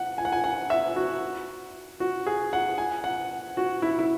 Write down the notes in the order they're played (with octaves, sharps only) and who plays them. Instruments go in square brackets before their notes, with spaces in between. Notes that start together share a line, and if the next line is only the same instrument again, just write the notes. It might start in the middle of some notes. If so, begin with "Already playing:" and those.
Already playing: [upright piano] F#5
G#5
F#5
G#5
F#5
E5
F#4
F#4
G#4
F#5
G#5
F#5
F#4
E4
E4